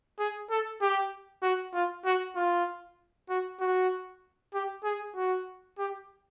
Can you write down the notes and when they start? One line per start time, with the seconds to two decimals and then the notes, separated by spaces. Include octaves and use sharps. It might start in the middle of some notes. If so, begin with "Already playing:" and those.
0.19 G#4
0.50 A4
0.82 G4
1.43 F#4
1.74 F4
2.05 F#4
2.36 F4
3.30 F#4
3.60 F#4
4.54 G4
4.84 G#4
5.16 F#4
5.78 G4